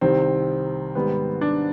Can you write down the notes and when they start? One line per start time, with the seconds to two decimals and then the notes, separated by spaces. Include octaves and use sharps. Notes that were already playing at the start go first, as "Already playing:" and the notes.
0.01 C2 C3 D#3 C4
0.95 G#2 D#3 G3 B3
1.41 D4